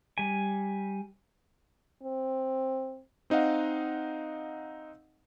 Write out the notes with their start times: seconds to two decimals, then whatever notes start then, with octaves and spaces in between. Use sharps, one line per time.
0.18 G3 G#5
2.03 C4
3.30 C4 D#4 D#5 F5 F#5